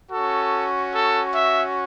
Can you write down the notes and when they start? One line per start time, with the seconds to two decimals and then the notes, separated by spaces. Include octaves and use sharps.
0.11 C#4 F#4 A4
0.92 A4
1.33 E5